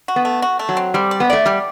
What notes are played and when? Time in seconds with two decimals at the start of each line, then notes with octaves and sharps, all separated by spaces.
0.08 F#4
0.16 B3
0.25 A3
0.42 F#4
0.59 A3
0.69 F#3
0.77 C4
0.94 G3 C4
1.11 D5
1.20 B3
1.30 A3 D5
1.46 G3 G4